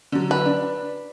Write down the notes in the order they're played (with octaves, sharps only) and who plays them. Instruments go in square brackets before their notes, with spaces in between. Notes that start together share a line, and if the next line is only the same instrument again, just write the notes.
[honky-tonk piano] D3 F#3
[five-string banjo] B4
[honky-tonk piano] D4